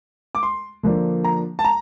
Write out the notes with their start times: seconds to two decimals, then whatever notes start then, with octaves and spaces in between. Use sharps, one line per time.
0.35 D6
0.43 C6
0.83 D3 F3 A#3 D4
1.24 A#5
1.59 A5
1.64 A#5